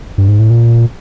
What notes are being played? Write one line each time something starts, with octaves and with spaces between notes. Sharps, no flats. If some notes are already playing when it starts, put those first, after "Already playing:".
G2
G#2
A2
A#2